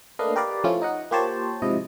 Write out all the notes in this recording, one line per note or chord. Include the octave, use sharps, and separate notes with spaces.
A3 A#3 D4 B4 D#5 F5
G4 A#4 B4 D5 F5
F3 A3 C#4 E4 F4
D#4 D#5 F#5
A#3 F4 G4 C5 C#5 A5
G#2 C3 F3 E4 D#5